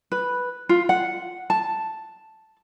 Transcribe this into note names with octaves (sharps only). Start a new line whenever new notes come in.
B4
F4
F#5
A5